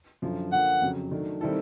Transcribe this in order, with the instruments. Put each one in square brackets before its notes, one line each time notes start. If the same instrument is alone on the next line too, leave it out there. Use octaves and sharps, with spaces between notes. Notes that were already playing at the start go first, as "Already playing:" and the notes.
[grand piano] F#2 D3 F3
[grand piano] D3 F3 A#3 [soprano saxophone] F#5
[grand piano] F2 C#3 F#3
D#3 F#3 A3 D4
D#3 G3 C4 E4 A4